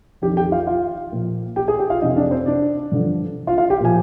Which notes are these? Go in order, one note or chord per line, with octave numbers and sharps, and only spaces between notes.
F2 D#3 G4 G5
G4 G5
F4 F5
F4 F5
A#2 F3
G4 G5
G#4 G#5
G4 G5
F4 F5
F2 C3 F3 D#4 D#5
D4 D5
C4 C5
D4 D5
G2 D3 F3
F4 F5
F4 F5
G4 G5
A#2 F3 G#5